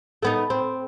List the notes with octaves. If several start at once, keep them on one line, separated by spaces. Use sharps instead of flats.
A3 B3 D#4
C4